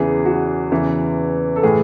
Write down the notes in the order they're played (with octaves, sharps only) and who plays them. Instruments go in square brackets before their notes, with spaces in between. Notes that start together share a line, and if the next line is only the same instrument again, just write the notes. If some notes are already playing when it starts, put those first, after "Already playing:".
Already playing: [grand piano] E2 C#3 E3 G#4
F#4
E2 C#3 E3
A4
A2 E3 G#4